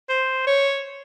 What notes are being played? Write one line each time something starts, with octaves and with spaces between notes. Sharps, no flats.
C5
C#5